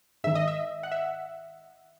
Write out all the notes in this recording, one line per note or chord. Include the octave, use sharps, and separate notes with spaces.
G#2 D#3 E5
D#5
E5
F#5
E5